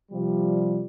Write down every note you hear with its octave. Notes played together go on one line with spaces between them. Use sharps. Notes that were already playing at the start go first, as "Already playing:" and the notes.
C3 F3 G3